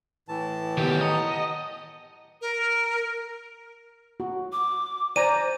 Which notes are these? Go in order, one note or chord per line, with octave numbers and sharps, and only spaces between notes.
A2 E3 A5
D2 D#3 F#3 B3 G4
D#5 F#5 A#5
A#4
F#4
D6
C5 D5 G#5 A#5 D#7